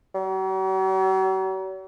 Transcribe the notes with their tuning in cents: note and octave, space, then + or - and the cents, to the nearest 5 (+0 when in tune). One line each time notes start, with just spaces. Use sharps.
F#3 +45